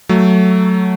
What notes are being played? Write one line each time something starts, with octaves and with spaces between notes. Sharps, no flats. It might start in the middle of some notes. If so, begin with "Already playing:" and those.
F#3 A3